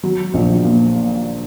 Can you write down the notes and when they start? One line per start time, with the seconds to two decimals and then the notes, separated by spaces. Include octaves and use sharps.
0.03 F#3
0.34 A#1
0.64 A#2